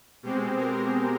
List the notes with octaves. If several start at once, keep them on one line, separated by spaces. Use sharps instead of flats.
B2 G#3 C4 G4
A#4